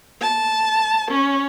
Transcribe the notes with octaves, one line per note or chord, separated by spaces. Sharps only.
A5
C#4